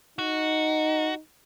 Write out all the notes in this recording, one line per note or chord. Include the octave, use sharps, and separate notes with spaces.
D#4 F#4